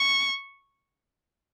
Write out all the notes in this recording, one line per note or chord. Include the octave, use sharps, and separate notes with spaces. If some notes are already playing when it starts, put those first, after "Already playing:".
Already playing: C#6